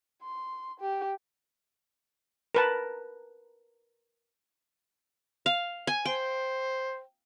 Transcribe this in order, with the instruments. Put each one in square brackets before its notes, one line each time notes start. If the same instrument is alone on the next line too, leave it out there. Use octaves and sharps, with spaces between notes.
[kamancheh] C6
G4
[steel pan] A#4 B4 A5
[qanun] F5
G#5
[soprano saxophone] C5 [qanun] G5